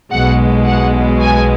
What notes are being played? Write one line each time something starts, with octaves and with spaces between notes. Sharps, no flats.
B1 B2 G#3 F#5
F#5
G#5